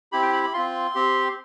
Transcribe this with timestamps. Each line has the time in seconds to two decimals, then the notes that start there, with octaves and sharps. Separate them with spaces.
0.12 C4 E4 G4 B5
0.22 G5
0.33 B5
0.43 B5
0.54 C4 F4 C6
0.95 C4 G4